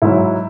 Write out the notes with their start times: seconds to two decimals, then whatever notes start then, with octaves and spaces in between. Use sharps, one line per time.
0.02 G#2 F#3 E4